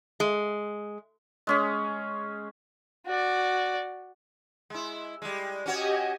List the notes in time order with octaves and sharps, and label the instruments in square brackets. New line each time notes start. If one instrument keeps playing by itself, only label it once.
[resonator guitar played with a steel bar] G#3
[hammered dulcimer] G#3 C#4 G#4
[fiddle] F#4 D5
[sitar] G#3 E4
G3 G#3
[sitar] C#4 F#4 C#5 [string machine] G4 D#5 G#5